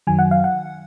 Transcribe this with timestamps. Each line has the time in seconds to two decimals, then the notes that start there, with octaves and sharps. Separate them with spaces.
0.07 F#2 D#3 F#3 G#5
0.19 F#5
0.31 F5
0.44 F#5